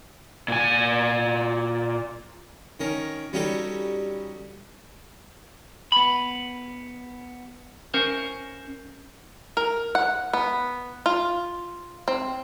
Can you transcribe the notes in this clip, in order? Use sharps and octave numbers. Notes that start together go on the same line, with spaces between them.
A#2 G#5
D#3 C#4 A#4
G3 C#4 D#4 F#4 G4 A4
B3 B5
C#4 A#4 C5
A#4
F#5
B3
F4
C4